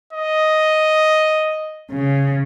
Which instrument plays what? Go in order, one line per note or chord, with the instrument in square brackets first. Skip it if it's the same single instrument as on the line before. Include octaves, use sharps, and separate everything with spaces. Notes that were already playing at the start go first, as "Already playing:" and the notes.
[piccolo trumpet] D#5
[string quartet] C#3